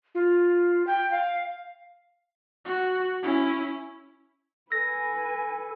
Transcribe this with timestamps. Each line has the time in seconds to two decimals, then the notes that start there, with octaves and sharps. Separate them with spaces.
0.15 F4
0.87 G5
1.11 F5
2.65 F#4
3.23 C#4 E4
4.72 A4 B4 G#5 A#6